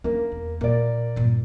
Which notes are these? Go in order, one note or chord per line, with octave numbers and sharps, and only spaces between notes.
A#3 C#4 D4
E2
A#2 A#3 D5
G2 A#2